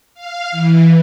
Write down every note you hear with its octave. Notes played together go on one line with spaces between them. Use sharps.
F5
E3